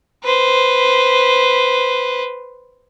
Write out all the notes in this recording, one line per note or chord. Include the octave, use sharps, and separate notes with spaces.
B4 C5